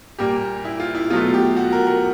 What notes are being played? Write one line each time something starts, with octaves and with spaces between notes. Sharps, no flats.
A#2 G3 A#3 G4
E4
F4
E4
B2 F#3 A3 F4
G4
F#4
A#4
A#4